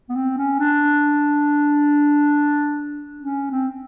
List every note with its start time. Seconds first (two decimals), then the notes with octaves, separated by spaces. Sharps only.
0.09 B3
0.16 C4
0.37 C#4
0.59 D4
3.21 C#4
3.51 C4